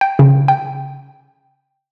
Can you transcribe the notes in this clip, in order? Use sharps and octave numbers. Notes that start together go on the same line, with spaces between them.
G5
C#3
G5